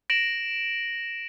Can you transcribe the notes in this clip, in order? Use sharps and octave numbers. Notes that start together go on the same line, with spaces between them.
A#6 D7 E7 F#7